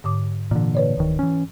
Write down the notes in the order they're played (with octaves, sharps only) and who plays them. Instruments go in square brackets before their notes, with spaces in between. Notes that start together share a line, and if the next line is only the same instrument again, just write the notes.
[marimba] G#2 D3 D6
[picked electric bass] A#2 D3 [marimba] E3
[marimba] B4 C#5 D5
[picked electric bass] D1 D#3
E3 C#4